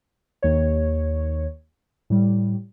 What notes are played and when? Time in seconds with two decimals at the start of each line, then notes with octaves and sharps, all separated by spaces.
0.43 D#2 C#5
2.10 A2 G3